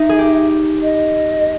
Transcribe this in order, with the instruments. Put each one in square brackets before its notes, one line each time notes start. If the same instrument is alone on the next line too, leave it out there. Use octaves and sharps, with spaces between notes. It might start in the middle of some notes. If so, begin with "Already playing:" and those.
Already playing: [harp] D#4 [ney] E5
[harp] G#4
G4
[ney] D#5